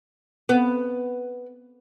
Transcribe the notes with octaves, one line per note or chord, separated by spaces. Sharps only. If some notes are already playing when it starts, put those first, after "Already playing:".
B3